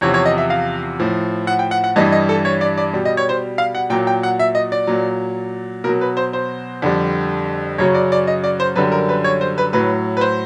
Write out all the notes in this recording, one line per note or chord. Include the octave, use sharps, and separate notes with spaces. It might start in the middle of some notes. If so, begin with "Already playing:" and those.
E2 C3 F3 C#5
C#5
D#5
E5
F5
A2 F3
F#5
G5
F#5
F#5
G2 E3 G3 D#5
D#5
A4
C#5
D5
D5
B2 G3
D#5
C#5
C5
F5
F#5
A#2 F#3 G5
G5
F#5
E5
D#5
D5
A#2 F#3
B2 F#3 A#4
B4
C5
C5
F2 D3 G3
F#2 C#3 F#3 C#5
D5
D5
D#5
D5
C5
F#2 D3 G3 B4
A#4
B4
C#5
C5
B4
A2 F#3 B4
B4
C5